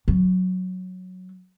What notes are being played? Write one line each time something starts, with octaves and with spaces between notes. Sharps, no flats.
F#3